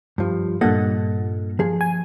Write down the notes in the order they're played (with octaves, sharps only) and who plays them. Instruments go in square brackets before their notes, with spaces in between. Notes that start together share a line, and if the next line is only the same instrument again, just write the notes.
[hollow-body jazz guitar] G2 F3
[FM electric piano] G2 A#2 [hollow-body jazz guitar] A4 D#5 F#5
[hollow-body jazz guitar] F3 G#4
[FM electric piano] G#5